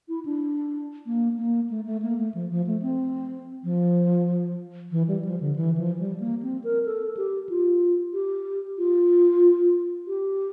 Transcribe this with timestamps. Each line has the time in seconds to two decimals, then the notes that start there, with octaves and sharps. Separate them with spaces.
0.09 E4
0.25 D4
1.06 A#3
1.38 A#3
1.70 A3
1.86 A3
2.02 A#3
2.18 A3
2.34 F3
2.50 F3
2.67 A3
2.82 C4
3.64 F3
4.92 E3
5.08 G3
5.25 F3
5.40 D3
5.56 E3
5.77 F3
5.99 G3
6.20 A#3
6.43 C4
6.64 A#4
6.85 A4
7.17 G4
7.49 F4
8.13 G4
8.78 F4
10.07 G4